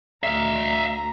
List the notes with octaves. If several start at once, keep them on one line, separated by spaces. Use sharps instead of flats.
D2 E5 F5 A#5